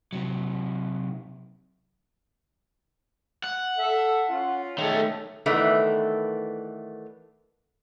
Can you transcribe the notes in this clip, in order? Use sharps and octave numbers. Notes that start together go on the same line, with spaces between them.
C3 F#3
F#5
A4 E5
C#4 F4
D#3 A3 G#4 A4 C#5
D#3 E3 A3 B3 D4